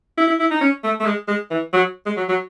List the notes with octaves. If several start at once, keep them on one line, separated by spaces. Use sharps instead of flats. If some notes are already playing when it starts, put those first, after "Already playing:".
E4
E4
E4
D#4
C#4
A3
A3
G#3
G#3
E3
F#3
G#3
F#3
F#3